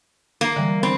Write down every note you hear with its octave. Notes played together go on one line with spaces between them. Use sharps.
A#3
D3 E3 G3
C4 B5